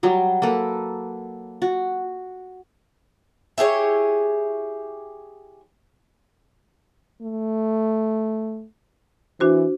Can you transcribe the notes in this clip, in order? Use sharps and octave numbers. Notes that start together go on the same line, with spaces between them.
F#3 G3
A#3 A4 B4
F#4
E4 G4 G#4 C#5
A3
E3 D4 F#4 C5